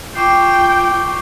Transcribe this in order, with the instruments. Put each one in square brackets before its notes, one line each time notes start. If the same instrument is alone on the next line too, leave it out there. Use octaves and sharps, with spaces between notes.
[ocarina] F4 [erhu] G5 [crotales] C#6 D6 C7